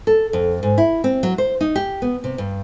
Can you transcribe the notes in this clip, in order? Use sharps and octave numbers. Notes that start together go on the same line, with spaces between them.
A4
F2
G#2
E4
C4
F#3
C5
D#4
G4
B3
C3
G2